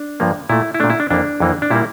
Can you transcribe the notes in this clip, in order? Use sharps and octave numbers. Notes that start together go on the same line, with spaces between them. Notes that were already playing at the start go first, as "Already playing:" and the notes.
Already playing: D4
G2 F3 A#3
A#2 A3 E4
E4
A#2 A3 D4
E4
D4
F2 E3 A#3 D4
F2 E3 A#3
D4
A#2 G3 A#3 E4